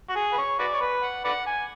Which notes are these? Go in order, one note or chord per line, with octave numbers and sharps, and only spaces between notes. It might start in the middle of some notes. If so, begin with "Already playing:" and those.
F#4
G#4
B4
C#5
F#4 B4 D5
C#5
B4
F#5
B4 D5 F#5
G#5